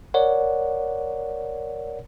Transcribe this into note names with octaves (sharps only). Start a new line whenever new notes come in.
A#4 C#5 D5 F#5